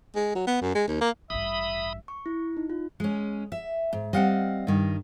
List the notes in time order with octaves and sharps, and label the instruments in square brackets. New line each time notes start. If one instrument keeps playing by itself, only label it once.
[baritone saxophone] G#3
F#3
B3
F#2
G#3
D#2
A#3
[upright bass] A1 G2 [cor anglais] E5 [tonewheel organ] B5 D#6
[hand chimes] C#6
E4
D#4
F4
[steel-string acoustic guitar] G#3 C#4
E5
G#2
[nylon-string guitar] G3 C4 [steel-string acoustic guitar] D#5 F5 F#5
[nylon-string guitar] G2 D#3